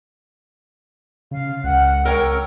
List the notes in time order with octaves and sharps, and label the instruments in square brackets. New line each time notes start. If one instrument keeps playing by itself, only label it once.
[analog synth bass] C#3 [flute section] F5
[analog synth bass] C#2 [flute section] F#5 F6 F#6
[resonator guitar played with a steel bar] A#4 C#5 G5 [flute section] E6